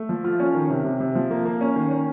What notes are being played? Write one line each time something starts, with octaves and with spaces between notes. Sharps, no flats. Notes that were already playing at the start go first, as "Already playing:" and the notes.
Already playing: A3
F3
F4
C#4
D#3
C3
C3
C3
F3
A#3
A#3
C#4
D#3
C#4